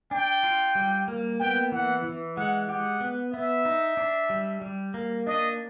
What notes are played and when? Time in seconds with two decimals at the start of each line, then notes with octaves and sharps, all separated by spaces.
0.11 D4 G5
0.43 F4
0.75 G3
1.08 A#3
1.40 B3 G5
1.72 E3 F#5
2.04 E3
2.37 G#3 F#5
2.69 G4 F#5
3.00 B3
3.33 B3 E5
3.65 D#4
3.97 D4
4.30 G3
4.62 G3
4.94 A#3
5.26 D4 D#5